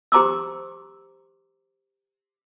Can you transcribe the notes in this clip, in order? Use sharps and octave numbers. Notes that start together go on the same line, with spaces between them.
G4 C5 A#5 C6 D6 E6